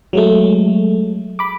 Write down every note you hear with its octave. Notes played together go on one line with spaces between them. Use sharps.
F#3 G#3 A3
B5 D6